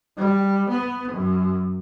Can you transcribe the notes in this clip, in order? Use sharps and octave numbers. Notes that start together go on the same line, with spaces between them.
G3
B3
F#2